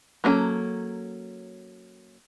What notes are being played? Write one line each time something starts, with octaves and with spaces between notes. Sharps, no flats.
F#3 A#3 C#4 A4